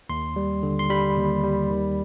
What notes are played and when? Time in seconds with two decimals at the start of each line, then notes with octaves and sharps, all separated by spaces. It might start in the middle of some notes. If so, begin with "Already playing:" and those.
0.09 D#2 C6
0.36 G3
0.63 D3
0.79 C6
0.90 G3 B5
1.17 D#2
1.43 G3
1.70 D#3